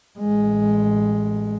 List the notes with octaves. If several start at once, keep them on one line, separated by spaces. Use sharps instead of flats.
A1 G#3